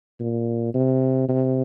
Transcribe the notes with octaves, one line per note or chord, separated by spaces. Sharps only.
A#2
C3
C3